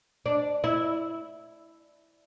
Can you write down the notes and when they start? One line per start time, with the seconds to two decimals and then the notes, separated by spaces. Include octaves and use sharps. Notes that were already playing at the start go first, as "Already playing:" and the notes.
0.26 D4
0.64 E4